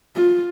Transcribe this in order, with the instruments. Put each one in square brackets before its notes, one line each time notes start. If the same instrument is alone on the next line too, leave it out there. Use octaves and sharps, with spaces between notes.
[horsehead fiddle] F4